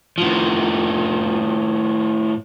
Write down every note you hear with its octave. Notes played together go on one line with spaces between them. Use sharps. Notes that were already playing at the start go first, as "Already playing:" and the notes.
A2 F3